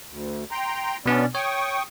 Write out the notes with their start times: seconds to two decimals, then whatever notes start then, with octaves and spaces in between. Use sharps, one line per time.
0.09 D2
0.51 G5 A#5 C6
1.06 B2 B3 C#4 D4 D5
1.35 C#5 G5 C#6 D#6